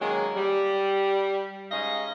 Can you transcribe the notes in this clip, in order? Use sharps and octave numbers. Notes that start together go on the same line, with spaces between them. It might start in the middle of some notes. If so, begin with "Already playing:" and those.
D#3 F#3 G#3 A#3 C#4
G3
G#2 C#4 D#4 D#5 F5